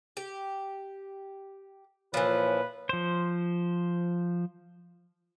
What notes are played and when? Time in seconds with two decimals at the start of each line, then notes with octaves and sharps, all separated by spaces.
0.17 G4
2.14 A#2 E3 F3 F4 B4 C#5
2.89 F3 C5